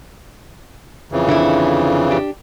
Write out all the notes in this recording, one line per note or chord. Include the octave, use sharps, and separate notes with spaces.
F2 C#3 E3
D3 D4 E4
D4 G4